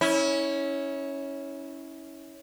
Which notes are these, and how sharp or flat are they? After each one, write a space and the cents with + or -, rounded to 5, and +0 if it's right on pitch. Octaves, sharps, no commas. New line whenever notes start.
C#4 +0 E4 -30